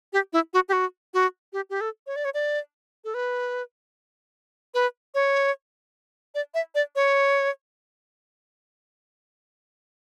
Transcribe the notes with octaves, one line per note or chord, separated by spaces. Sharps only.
G4
E4
F#4
G4
F#4
F#4
G4
G4
A4
C#5
D5
C#5
D5
A4
B4
B4
C#5
D5
E5
D5
C#5